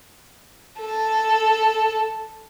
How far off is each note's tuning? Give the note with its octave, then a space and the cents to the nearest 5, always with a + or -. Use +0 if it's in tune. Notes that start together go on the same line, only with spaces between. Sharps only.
A4 +0